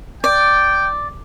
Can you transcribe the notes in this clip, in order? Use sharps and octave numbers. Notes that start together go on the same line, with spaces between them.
D5 G5